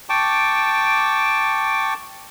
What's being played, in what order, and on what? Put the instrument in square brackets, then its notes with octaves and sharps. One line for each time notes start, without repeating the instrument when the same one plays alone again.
[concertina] G5 A5 C#6 D6